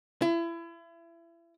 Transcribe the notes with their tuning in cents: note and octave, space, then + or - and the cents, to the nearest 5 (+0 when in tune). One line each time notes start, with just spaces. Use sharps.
E4 +30